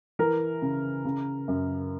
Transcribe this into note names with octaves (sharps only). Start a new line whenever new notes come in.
E3 A#4
C#3
C#3
F#2